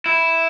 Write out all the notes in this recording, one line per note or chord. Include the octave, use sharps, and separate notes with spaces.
E4